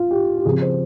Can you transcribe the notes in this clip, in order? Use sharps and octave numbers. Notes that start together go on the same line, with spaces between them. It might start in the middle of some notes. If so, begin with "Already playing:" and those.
Already playing: F4
G4
G4
C#3 F3 C4 G#4
C5